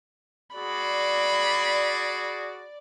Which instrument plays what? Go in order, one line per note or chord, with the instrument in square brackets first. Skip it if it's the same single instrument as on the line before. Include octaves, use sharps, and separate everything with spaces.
[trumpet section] F#4 G#4 [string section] D5 [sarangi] B5